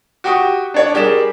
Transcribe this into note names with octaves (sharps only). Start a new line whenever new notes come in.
F#4 G4 G5 C#6 D#6
D4 C#5 D5
G3 G4 G#4 A#4 E7